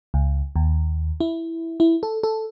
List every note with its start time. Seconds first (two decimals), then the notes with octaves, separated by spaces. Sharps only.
0.14 C#2
0.56 D#2
1.20 E4
1.80 E4
2.03 A4
2.23 A4